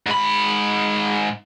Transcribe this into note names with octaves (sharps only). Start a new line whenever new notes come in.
G#2 B5